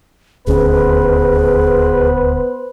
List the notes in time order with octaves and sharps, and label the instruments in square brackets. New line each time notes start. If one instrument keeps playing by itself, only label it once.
[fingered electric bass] D#1 D2 C#4 [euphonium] B3 [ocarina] G#4 [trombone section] B4 C5